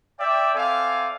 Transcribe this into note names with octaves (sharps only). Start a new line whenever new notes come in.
D5 E5 G5
C4 A4 D5 E5 F5 G#5